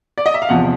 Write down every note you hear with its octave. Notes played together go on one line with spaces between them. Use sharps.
D5
D#5
E5
F5
E2 C3 F3 F#5